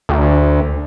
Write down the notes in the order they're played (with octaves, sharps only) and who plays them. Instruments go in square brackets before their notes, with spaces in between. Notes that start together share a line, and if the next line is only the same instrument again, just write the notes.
[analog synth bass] D2